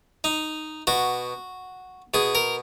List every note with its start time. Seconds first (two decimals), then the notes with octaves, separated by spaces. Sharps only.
0.24 D#4
0.87 B2 F#4
2.14 B2 G#4
2.35 A#4